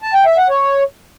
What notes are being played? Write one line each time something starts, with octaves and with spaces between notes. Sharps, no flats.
A5
G5
E5
F#5
C#5